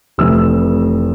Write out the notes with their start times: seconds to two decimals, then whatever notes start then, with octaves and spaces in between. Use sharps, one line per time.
0.18 F1 F2 E3 A3 C4 E6